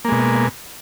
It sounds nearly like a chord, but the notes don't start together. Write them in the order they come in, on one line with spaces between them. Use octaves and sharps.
A#3 G#3 B2